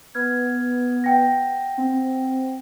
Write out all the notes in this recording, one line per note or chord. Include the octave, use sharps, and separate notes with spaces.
B3 F6 G#6
F#5 G5 A#6
C4